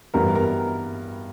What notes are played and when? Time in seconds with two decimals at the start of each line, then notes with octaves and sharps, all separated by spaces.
0.14 G2 E3 G3 B3 A#4 A#5
0.35 A#4 A#5